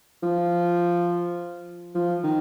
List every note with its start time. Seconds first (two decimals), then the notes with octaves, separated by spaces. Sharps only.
0.23 F3
1.95 F3
2.23 D#3